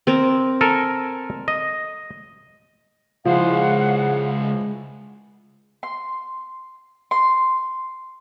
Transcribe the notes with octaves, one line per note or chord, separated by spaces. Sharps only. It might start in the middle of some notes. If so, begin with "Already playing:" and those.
C4 A#4
A4 A#4 G#5
D#5
C#2 F3 G#3 E4 C5 D#5 F5 F#5
C6
C6